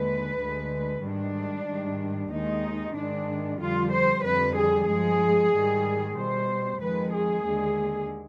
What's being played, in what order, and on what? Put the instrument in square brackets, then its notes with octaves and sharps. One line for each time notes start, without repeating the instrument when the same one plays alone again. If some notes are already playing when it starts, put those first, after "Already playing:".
Already playing: [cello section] D#2 D3 G#3 B4
D2 D3 G#3
G#2 D#3 G3 D4
G#2 D#3 G3
D#2 D#3 G#3 D#4
G#2 D#3 G#3 D4
F2 D3 G3 F4
C5
F2 D3 G3 B4
G#4
G2 F3 G#3 G#4
G#2 D#3 G3
B2 G3 C5
F2 D#3 G#3 B4
G#4
D#2 D3 G#3